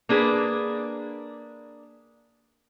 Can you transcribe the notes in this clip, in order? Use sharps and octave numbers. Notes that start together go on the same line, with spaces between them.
A#3 D4 G#4 B4